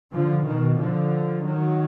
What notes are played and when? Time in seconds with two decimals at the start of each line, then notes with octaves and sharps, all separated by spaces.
0.13 D3 F3
0.46 B2 D#3
0.79 D3 F3
1.46 D#3 F#3